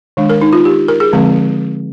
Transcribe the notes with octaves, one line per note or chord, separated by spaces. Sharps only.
D#3 G#3 D4
A#4
D#4
F4
G4
A#4
G#4
D3 F3 G#3 C4